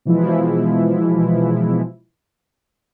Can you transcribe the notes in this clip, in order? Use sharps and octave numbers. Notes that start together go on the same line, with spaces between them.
B2 E3 F3 G#3 E4